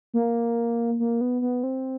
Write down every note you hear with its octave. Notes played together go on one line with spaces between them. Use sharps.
A#3
A#3
B3
B3
C4